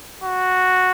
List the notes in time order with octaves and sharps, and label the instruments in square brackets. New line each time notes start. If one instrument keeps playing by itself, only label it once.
[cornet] F#4